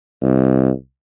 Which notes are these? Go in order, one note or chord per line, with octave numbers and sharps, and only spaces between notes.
C2